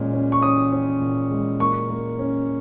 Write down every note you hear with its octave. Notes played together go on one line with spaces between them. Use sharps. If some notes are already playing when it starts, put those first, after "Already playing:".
Already playing: A#2 G#3 C#4
C#4
C#6
C#4 D#6
C#4
A#2
G#3
A#3 C#6
A#3
C#4